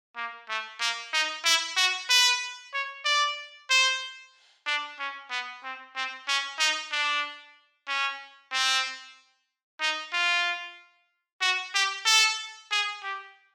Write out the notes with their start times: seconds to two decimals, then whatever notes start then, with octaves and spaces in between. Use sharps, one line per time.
0.16 A#3
0.49 A3
0.80 A#3
1.13 D#4
1.44 E4
1.76 F#4
2.10 B4
2.73 C#5
3.05 D5
3.70 C5
4.66 D4
4.99 C#4
5.30 B3
5.63 C4
5.95 C4
6.28 C#4
6.59 D#4
6.92 D4
7.88 C#4
8.52 C4
9.81 D#4
10.13 F4
11.41 F#4
11.74 G4
12.06 A4
12.71 G#4
13.03 G4